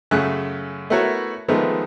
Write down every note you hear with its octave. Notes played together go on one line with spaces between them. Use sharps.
F#2 C#3 A3 F#6
A3 B3 E4 F#4 A#4 C#5
D#3 F3 G#3 A3 B3